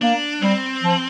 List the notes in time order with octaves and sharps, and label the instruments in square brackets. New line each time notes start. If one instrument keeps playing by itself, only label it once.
[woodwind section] A#3 [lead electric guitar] D4
[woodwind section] G3 [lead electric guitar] C4
[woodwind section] F3